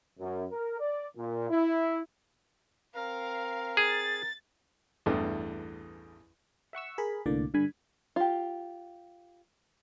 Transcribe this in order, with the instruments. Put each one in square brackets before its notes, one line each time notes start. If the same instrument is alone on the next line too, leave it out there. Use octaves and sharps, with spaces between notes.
[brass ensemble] F#2
A#4
D5
A#2
E4
[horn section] C4 A#4 [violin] F5
[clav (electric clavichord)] G#4 [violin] A6
[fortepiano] A1 E2 G2 A3
[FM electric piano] E5 F#5 C#6 E6
G#4 A#4 B5
C2 A2 D3 A#3 D5
G2 D3 G#5 B5
[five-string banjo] F4 G4